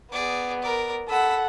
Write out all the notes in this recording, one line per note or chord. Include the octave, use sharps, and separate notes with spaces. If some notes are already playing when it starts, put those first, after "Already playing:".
B3 G#4 D5
A#4 D5
A4 F#5 B5 E6